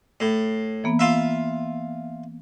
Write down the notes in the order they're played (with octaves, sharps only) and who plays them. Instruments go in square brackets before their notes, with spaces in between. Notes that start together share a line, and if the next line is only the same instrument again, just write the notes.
[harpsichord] A2
[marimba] E3 A#3 B3
[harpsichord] F4 E5